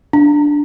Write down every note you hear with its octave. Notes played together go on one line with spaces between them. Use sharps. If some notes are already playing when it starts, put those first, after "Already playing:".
D4